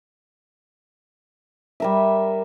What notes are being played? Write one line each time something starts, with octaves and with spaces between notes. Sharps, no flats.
G3 A#4 E5